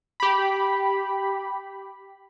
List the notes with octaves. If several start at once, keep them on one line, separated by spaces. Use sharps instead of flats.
G4 B5